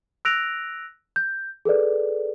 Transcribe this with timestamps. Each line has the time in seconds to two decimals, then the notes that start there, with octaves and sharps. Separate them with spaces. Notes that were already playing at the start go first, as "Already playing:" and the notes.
0.25 E6 F#6 A#6 D7 F7
1.16 G6
1.65 G#4 A4 B4 D5